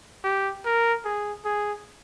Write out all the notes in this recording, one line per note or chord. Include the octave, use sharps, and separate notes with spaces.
G4
A#4
G#4
G#4